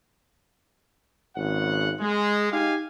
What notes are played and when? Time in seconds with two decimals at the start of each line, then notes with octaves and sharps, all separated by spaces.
1.36 G#1 C#3 F#5
2.00 G#3
2.51 D#4 G4 F5 G#5